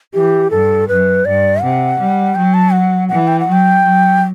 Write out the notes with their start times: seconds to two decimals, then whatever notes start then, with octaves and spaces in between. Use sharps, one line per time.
0.14 E3 G4
0.51 G2 A4
0.88 F#2 B4
1.24 G2 D5
1.61 C3 F#5
1.99 G3
2.35 F#3 G5
2.54 A5
2.73 F#5
3.09 E3 F#5
3.27 G5
3.40 F#5
3.46 F#3
3.52 G5
3.83 F#3